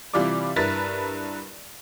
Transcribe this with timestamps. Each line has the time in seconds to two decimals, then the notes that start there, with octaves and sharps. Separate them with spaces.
0.14 C3 E3 G3 F4 D5 D6
0.56 G2 E4 A#4 B4 A6 B6